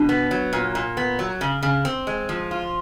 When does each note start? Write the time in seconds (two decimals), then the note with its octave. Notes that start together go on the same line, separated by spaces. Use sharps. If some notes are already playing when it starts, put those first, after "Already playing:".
Already playing: B2 D4
0.09 B3
0.31 F#3
0.53 A#2
0.75 A#2
0.97 B3
1.19 F#3
1.41 C#3
1.63 C#3
1.85 C4
2.07 G#3
2.29 F3
2.51 F4